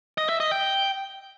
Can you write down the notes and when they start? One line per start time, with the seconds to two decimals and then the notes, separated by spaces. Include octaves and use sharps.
0.18 D#5
0.29 E5
0.40 D#5
0.51 G5